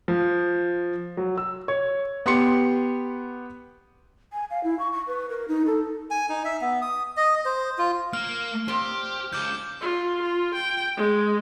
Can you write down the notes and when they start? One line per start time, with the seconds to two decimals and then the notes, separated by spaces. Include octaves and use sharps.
0.08 F3
1.17 F#3
1.37 E6
1.68 C#5
2.26 B3 G4 C6 C#7
4.33 G#5
4.50 F5
4.64 E4
4.79 C#6
4.92 C#6
5.07 B4
5.29 A#4
5.48 D#4
5.66 A4
6.11 G#5
6.29 D#4
6.45 E5
6.61 B3
6.82 D#6
7.17 D#5
7.45 C5
7.78 F4
8.13 A#3 F6
8.68 A#2 C4 G4
9.33 C#2 D6 F6 G6
9.81 F4
10.22 F4
10.55 G5
10.97 G#3